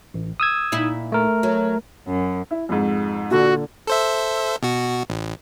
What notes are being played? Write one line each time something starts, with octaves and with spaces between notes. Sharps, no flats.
A1
D#6 E6 G#6
A#2 D#4 E4
A3 A#4
F#3
F#2
E4
F2 G#2
A#2 D3 F#4 A4
A4 C5 E5
B2 F#4
A1